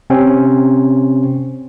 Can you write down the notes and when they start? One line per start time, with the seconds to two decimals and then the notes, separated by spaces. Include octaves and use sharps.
0.10 C3 C4 C#4